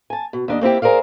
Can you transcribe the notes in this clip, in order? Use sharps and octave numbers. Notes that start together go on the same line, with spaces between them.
G#5 A5
B2
D#2 D4 D#5
A#3 C4 E4 G4
G#4 A#4 C5 D5 F5